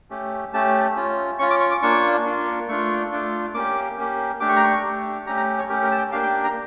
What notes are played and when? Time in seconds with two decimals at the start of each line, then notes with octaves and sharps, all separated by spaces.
0.10 A3 C#4 G4
0.53 A3 C#4 G4 A5
0.96 C#4 F4
1.39 C#4 F4 C#6
1.50 D6
1.60 C#6
1.72 D6
1.82 A#3 D4 F4 C#6
2.25 A#3 D4 F4
2.68 A3 D4 F4 C#6
3.11 A3 D4 F4
3.54 A#3 C#4 G4 D6
3.97 A#3 C#4 G4
4.40 A3 D4 G4 D6
4.49 C#6
4.56 A#5
4.64 C#6
4.83 A3 D4 G4
5.26 A3 C#4 G4 A#5
5.37 A#5
5.59 C#5
5.69 A3 C#4 G4 A#4
5.83 A#4
5.92 A5
5.98 G5
6.12 A#3 D4 G4 F5
6.23 G5
6.44 A#5